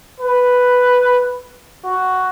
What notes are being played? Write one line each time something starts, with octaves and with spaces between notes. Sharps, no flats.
B4
F#4